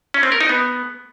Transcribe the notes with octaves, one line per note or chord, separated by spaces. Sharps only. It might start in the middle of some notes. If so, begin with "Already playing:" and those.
C#4
C4
A#4
D#4
B3